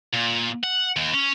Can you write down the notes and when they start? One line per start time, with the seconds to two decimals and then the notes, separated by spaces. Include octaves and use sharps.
0.13 A#2
0.63 F#5
0.96 D#2
1.14 C#4